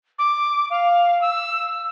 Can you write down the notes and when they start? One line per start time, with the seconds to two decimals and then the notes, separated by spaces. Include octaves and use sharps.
0.19 D6
0.70 F5
1.21 E6